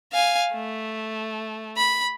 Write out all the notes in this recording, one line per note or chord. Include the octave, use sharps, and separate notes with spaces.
F5 G#5
A3
B5